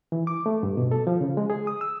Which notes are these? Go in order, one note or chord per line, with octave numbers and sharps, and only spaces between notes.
E3
D6
A3
G2
B2
A4
F3
C#3
G#3
G#4
D#6
E6